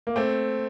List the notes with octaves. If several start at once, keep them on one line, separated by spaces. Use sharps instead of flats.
A#3
A3 C4